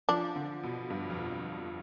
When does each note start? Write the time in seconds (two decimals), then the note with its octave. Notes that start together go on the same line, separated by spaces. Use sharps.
0.09 F3 D4
0.36 D3
0.63 B2
0.90 G2
1.10 F2